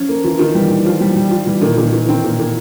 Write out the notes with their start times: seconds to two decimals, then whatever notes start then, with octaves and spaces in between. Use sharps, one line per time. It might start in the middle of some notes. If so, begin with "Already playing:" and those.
Already playing: F3 C#4
0.09 A#3
0.24 E3 F4
0.39 D#3 F4
0.55 E3 G3
0.70 G3
0.85 F3 F4
1.01 G3
1.16 G3
1.31 F4
1.46 E3 G3
1.62 A#2 D#3
1.77 A#2 D#3
1.93 A#2 E3
2.09 D#3 C4
2.24 A#2
2.39 A#2